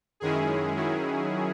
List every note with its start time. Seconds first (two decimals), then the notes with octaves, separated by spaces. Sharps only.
0.20 F#2 D#3 G#3 C#4 E4 G#4
0.75 D#3 F#3 C#4 E4